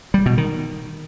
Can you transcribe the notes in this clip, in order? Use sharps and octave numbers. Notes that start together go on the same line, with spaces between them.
G3
B2
D#3